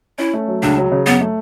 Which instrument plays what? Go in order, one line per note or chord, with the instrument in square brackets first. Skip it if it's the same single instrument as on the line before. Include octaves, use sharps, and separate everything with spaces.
[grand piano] C#4 [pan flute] E4
[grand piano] A3
F#3
[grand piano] C#2 [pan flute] D4
[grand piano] F#3
C#3
[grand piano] F#2 [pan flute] B3
[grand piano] A3